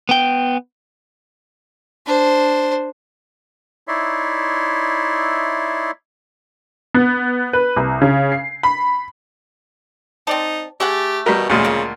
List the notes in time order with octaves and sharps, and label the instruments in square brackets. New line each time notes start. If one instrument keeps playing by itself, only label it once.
[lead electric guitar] B3 G5
[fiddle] D4 C5
[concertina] D#4 E4 C#5 D5 E5 C6
[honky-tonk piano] B3
B4
C2
C#3
C7
B5
[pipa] C4 D5 A5 [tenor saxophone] D#4
[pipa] A3 G#4 F#5 [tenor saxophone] G4
[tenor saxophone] B2 [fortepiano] G3 A#4
[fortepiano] D2 A#2 G#3 [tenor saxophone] C#3
[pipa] A#3 F4